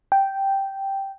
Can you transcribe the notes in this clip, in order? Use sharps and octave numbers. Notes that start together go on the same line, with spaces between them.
G5